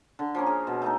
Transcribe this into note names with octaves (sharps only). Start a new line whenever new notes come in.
D3
F3 A#3 C#4
G#4
B2
A3 D#4 A4